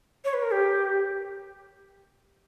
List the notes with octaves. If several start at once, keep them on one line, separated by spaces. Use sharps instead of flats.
C#5
B4
A#4
G4